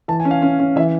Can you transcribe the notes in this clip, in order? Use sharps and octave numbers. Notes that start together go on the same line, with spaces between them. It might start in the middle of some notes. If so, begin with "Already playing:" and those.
E3 A5
G#5
C#4
F5
C#4
C#4
E3 E5